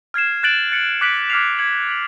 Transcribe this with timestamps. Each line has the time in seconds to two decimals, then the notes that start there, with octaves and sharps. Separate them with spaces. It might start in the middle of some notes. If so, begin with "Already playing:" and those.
0.14 F6 G#6 C7 E7
0.43 F#6 A6 D7 F#7
0.72 A6 C#7 F#7
1.01 D6 F#6 B6 D7 F#7
1.30 D6 F6 G#6 C7 F7
1.59 G#6 C#7 F#7
1.87 F#6 B6 D7 F#7